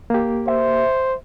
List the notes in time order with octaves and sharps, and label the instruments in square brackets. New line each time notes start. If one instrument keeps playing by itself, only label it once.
[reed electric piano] A#3 G4
[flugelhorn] C5 [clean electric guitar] E5